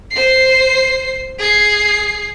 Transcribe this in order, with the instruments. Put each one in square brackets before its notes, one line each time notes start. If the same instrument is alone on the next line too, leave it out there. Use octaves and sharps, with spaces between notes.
[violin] C5 C7
G#4 C7